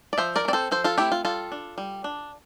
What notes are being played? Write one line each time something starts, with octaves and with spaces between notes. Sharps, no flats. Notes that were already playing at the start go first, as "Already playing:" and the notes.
D5
F3 C5 E5
A#4 D5
A3
C4 D5
A4 C5
F3 A4 C5
F4 A4
A3 C4 E4 G4
F4
G3 F4 A4
D4
G3
D4